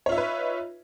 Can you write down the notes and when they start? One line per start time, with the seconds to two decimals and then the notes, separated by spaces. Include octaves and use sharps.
0.06 C#5
0.09 F4
0.12 E5
0.15 D#4
0.18 B4